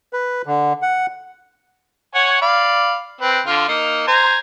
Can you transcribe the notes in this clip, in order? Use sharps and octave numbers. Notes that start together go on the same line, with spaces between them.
B4
D3
F#5
C#5 F#5 G#5
D5 F5 B5
C4 B4
D3 F4
A#3 D#4
C5 G#5 A#5